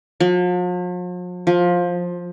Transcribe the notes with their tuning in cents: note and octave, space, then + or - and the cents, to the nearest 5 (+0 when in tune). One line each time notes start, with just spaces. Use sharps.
F3 +45
F3 +15